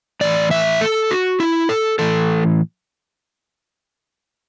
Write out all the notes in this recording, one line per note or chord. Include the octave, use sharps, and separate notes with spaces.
A2 E3 D5
E5
A4
F#4
E4
A4
A2 E3 A4